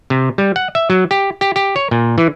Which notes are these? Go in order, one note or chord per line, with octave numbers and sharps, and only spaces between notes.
C3
G3
F#5
E5
F#3
G4
G4
G4
C#5
A#2
E3